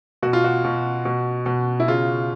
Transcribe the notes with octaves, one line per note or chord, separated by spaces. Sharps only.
B2 F#4
F4
F#4
B2
B2
B2
E4
C#3 F4